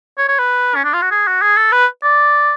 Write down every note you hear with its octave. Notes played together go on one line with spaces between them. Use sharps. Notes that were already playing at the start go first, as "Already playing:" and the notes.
C#5
C#5
B4
C#4
D4
F4
F#4
G#4
F#4
G#4
A4
B4
D5